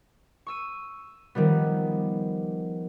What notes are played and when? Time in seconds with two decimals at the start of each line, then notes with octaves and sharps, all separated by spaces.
0.47 C#6 E6 D#7
1.35 D#3 F3 G3 B3